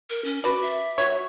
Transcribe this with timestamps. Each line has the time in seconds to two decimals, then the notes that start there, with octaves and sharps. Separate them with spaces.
0.10 A#4
0.24 C#4
0.44 F#4 B4 D5
0.62 E5
0.98 F#3 F#4 C#5